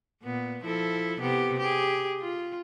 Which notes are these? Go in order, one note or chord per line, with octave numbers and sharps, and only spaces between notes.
A#2 B3
F3 E4 A4
C3 B3 G4
G4 G#4
F4